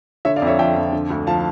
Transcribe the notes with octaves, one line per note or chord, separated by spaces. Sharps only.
D3 C#5 E5
D5 F5
F2
C#5 E5
F3 E5 G5
F2
D3
D2
F3 F5 A5